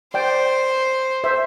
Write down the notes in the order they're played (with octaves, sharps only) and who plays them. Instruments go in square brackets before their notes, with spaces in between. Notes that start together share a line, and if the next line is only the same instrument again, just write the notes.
[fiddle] C5 [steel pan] D5 G5
[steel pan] C5 E5